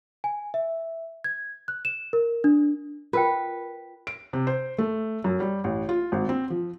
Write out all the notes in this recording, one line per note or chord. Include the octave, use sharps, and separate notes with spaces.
G#5
E5
G#6
F#6
E7
A#4
D4
F4 A#4 B4 G5
D7
C3
C5
A3
F#2
G3
A1
F4
G#1
C4
F3